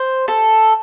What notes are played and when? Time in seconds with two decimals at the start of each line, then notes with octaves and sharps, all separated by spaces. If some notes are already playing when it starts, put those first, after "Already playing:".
Already playing: C5
0.28 A4